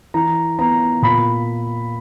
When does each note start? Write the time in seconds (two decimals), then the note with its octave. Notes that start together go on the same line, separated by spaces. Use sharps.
0.14 E3 A#5
0.59 B3 A#5
1.02 A#2 B5